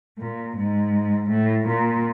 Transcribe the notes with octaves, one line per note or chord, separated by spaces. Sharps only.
A#2
G#2
A2
A#2